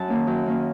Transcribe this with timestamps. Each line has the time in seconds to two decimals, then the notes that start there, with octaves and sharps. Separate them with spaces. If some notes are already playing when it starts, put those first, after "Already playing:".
Already playing: F#2 A5
0.08 D#3 A#3 C#4
0.27 F#2
0.46 D#3 A#3 C#4